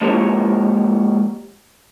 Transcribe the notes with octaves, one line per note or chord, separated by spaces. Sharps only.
F3 G#3 A#3 G4 A#4 C#5